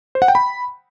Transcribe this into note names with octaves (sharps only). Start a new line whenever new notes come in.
C5
F#5
G5
B5